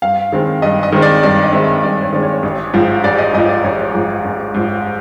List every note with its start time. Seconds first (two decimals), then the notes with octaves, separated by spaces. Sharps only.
0.02 G2 F5
0.33 D#3 G#3 C4
0.62 G2 D#5
0.83 D#5
0.92 D#3 G#3 C4
1.02 D5
1.23 G2 D5
1.44 D#5
1.53 D#3 G#3 C4 E5
1.83 G2 D5
2.03 C#5
2.13 D#3 G#3 C4 D5
2.23 C#5
2.43 A1
2.73 G#2 F3
3.04 A1 D5
3.18 D#5
3.33 G#2 F3 D#5
3.49 D5
3.64 A1 C#5
3.94 G#2 F3
4.25 A1
4.54 G#2 F3